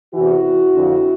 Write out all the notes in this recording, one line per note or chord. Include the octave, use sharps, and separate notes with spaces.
E2 C3 E3 E4 F#4
F2 D3 F3